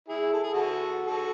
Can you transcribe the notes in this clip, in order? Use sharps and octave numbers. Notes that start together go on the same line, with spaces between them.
E4 G#4
A4
G#4
F#4 A4
F#4 A4